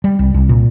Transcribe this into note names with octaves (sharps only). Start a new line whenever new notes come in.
G3
C2
C2
A#2